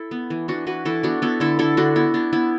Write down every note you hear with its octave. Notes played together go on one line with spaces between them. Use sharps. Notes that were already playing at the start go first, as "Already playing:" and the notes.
Already playing: E4 A4
B3
E3
E3 D4 F#4
E3 F#4 B4
E3 E4 A4
B3 D4 F#4
B3 E4 A4
D3 E4 A4
D3 E4 A4
D3 D4 F#4
B3 E4
B3 D4
B3 E4